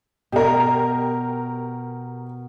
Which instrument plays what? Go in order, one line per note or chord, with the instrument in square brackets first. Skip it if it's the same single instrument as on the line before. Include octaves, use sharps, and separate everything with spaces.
[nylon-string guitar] B2 [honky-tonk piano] G4 A#4